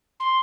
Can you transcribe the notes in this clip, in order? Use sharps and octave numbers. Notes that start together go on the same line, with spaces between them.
C6